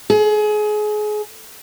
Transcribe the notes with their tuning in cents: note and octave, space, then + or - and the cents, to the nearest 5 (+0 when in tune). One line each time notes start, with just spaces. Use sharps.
G#4 +30